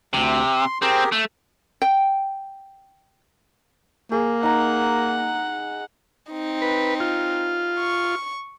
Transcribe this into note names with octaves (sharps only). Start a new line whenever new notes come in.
D2 C3
C6
C4 G4 G#4 A#4
A3
G5
A#3 G#4
D#4 F#5 A#5
C4 D#4
B4
F4
C#6